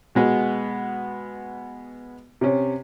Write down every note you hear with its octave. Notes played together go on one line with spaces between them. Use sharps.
B2 G#3 B3
C3 C#4